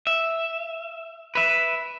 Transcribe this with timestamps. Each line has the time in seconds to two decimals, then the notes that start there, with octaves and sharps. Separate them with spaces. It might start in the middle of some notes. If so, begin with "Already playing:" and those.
0.07 E5
1.35 B4 E5